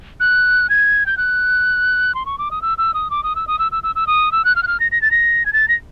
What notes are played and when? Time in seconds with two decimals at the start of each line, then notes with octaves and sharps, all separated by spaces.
0.20 F#6
0.70 G#6
1.06 G6
1.17 F#6
2.15 C6
2.26 C#6
2.38 D6
2.51 D#6
2.62 E6
2.78 E6
2.94 D#6
3.10 D6
3.24 D#6
3.36 E6
3.47 D#6
3.59 E6
3.72 E6
3.83 E6
3.95 E6
4.07 D#6
4.32 E6
4.45 F#6
4.56 F6
4.63 F#6
4.67 F6
4.80 A#6
4.92 A#6
5.02 A6
5.11 A#6
5.46 G#6
5.53 A6
5.68 A#6